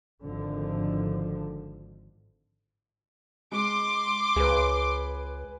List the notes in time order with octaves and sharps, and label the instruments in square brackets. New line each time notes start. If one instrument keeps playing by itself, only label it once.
[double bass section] G#1 G#2 D3 F3
[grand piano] G#3 [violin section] C6 D6
[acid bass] C#2 [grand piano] G#4 B4